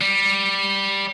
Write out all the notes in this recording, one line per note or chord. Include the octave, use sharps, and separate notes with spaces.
G3